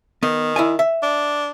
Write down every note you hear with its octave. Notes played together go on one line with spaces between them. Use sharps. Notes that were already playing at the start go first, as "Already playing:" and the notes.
D#3 B3
E4 D5 G#5
E5
D4